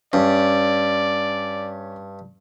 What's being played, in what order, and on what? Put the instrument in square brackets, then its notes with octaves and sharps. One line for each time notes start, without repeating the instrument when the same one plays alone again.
[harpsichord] G2 [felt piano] C#4 [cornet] D5